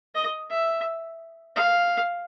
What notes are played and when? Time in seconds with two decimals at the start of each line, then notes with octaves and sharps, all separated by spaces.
0.15 D#5
0.50 E5
1.56 F5